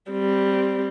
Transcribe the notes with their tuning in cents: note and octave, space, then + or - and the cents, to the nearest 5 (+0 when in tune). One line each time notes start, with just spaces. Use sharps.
G3 +0 C4 +0